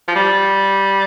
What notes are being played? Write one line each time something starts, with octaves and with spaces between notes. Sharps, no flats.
F3
G3